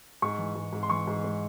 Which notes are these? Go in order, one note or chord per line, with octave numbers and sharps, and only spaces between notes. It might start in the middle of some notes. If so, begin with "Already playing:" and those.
G#2 C#6
E3
G#2
G#2
C6
E3 C#6
G#2
G#3